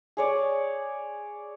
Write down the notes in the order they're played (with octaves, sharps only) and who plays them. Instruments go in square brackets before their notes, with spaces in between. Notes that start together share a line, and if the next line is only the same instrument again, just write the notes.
[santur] G#4 C#5 D5